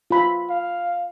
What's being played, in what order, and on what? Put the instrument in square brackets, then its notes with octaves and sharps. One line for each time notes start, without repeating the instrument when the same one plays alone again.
[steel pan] F4 B5
[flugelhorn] F5